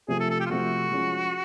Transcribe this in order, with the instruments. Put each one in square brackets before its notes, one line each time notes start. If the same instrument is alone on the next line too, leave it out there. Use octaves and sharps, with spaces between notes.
[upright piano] C3 F3 A3 [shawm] G#4
[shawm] A4
A4
G4
F4
[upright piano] C3 F3 A3 [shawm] F#4
[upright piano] F3 G#3 C#4 F4